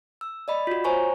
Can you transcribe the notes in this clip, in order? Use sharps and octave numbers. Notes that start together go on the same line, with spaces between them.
E6
D5 D#5 B5
F4 F#4
C5 C#5 G#5 A#5 C#6